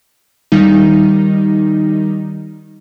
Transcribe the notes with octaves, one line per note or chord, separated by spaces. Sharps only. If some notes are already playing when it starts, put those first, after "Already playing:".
D#3 G3 D#4